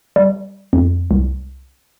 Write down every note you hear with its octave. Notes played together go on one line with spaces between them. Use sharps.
G3
F2
C2